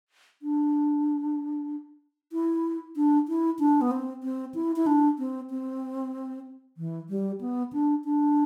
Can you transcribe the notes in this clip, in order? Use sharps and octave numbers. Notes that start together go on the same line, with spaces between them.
D4
E4
D4
E4
D4
B3
C4
C4
E4
E4
D4
C4
C4
E3
G3
B3
D4
D4